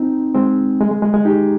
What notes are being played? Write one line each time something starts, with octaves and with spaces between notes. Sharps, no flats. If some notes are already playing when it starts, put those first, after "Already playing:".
Already playing: C4 D#4
G#3 C4
G#3
G#3
G#3
G#3
D#4 G4